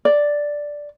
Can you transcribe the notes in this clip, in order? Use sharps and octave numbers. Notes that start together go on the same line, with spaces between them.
D5